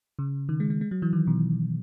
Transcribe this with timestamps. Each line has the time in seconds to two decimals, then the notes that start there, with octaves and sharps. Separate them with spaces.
0.19 C#3
0.49 D#3
0.60 G#3
0.70 G#3
0.81 G#3
0.91 F#3
1.02 E3
1.13 D#3
1.27 B2